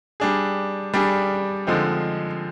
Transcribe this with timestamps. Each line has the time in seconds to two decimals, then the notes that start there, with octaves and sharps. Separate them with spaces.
0.20 G3 D4 G#4
0.94 G3 D4 G#4
1.67 D3 F3 G#3 C4 D#4